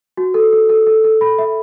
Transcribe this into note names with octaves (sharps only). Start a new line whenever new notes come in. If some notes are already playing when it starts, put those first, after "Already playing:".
F#4
A4
A4
A4
A4
A4
B5
E5